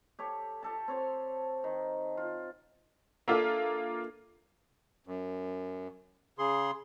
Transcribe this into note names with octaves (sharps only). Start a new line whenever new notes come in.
G4 A4 C#5
G4 A4 A5
C4 C#5 C6
D#3
F4
A#3 D4 F4 A4 E5
F#2
C#3 G#4 C6